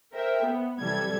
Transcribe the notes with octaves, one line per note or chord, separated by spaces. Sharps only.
A#4 C5 E5 G5
B3
C3 E3 F#3 G3 A4 G#6